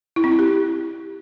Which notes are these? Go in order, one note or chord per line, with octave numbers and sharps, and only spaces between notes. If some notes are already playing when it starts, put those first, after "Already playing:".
E4
C4
E4
G4